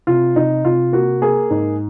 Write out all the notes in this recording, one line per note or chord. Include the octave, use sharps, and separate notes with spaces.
C3 F4
C3 D#4
C3 F4
A#3 F#4
A#3 G#4
G#2